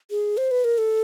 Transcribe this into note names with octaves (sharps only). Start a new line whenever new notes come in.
G#4
C5
B4
A#4
A4